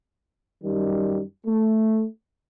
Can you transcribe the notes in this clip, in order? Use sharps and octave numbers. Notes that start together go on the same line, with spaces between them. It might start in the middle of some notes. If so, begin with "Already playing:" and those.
F#2 D#3 G3
A3